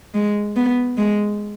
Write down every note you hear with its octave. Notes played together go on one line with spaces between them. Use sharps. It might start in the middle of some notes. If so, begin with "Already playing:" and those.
G#3
B3
G#3